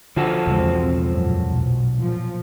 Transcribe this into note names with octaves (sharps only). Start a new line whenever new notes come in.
D3 F3 F#4 A4
B1 E2 C#3 G#3 C4
F#2 A#2
B1
A#2 F3